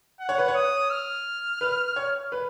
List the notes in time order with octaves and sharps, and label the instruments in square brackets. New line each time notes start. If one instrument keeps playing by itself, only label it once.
[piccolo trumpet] F#5
[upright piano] C#5
B4
C#5
[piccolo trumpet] D#6
F6
[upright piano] B4
C#5
B4